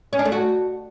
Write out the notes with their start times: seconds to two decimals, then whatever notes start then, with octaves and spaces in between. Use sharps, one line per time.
0.13 C#4
0.19 D4
0.26 A3
0.32 F#4